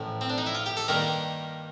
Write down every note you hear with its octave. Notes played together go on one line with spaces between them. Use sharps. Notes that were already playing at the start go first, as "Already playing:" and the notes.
Already playing: A1 A2 F3
C4
D4
D#4
E4
F4
G4
A4
G2 D#3 G3 A#3 A#4